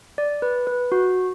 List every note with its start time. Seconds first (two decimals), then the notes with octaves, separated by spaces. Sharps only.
0.18 D5
0.42 B4
0.67 B4
0.92 F#4